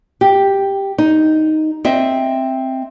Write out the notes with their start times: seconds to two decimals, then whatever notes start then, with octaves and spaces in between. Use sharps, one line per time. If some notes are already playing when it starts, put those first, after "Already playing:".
0.21 G4
0.98 D#4
1.85 C4 D#5 E5